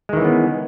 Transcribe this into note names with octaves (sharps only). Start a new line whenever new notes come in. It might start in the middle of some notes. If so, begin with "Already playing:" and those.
D#3 E3 G#3 B3 C#4